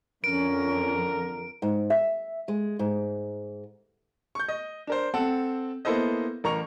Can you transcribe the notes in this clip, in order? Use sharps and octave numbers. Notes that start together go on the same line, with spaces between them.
F2 D3 C#4 A#4 D7
G#2
E5
G#3
G#2
C#6 G6
D#5
D4 A#4 C5
C4 A4 F#5 A5
A#3 B3 E4 A4 C5 D#5
A1 A#4 A#5 C#6 F7